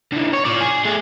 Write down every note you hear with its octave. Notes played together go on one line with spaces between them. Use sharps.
D3 E3
C#5
F4 D5
G#4
A3 G#4